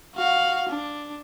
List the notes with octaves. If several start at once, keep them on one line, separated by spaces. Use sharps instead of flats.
F#4 F5
D4